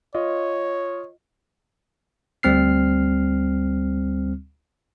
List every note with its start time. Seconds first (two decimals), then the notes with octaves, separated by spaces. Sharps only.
0.15 F4 C#5 D#5
2.43 D2 G3 C4 F6 C7